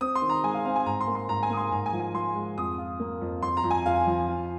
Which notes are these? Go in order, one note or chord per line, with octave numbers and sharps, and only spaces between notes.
C4 D#6
C6
D#3
A#5
G#3 G#5
F5
C4 F5
G#5
G#2 A#5
C6
A#3
C6
G#2 A#5
G#5
A#3 D#6
C6
G#2 A#5
G#5
F3
G#5
F3 C6
G#3
F2 D#6
F4
A#3
F2
F2 C6
A#5
F2
G#5
F2 F5
F3
F4